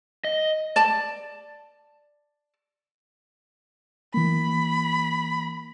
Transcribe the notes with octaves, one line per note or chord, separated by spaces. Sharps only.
D#5
D5 A5
E3 A#3 B5